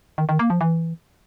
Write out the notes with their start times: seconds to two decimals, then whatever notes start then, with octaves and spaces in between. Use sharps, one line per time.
0.18 D#3
0.29 D#3
0.39 A#3
0.50 F3
0.61 E3